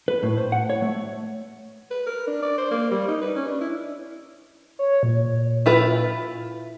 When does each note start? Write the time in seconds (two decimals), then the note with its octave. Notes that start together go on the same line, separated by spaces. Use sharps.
0.08 B4
0.23 A2
0.37 C5
0.52 F#5
0.70 C#5
0.82 A3
1.91 B4
2.06 A#4
2.27 D4
2.43 D5
2.58 C5
2.71 A#3
2.91 G3
3.08 D#4
3.22 B4
3.36 C#4
3.48 D4
3.61 E4
4.79 C#5
5.03 A#2
5.66 E4 F4 B4